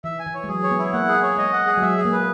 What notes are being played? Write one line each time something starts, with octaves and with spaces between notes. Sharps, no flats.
E3 E5
G#5
E3
C#5
G#3
F#3 G#4
C#5
B3
E4
A#3 F#5
G#4
C#5
G#3 D#5
F#5
G#4
F#3
G#3 E5
G#4
A#3
B4